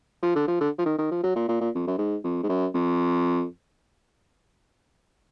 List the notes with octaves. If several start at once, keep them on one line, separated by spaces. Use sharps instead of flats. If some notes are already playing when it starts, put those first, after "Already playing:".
F3
D3
F3
D3
F3
D#3
D#3
F3
F#3
A#2
A#2
A#2
F2
F#2
G#2
F2
G#2
F#2
F2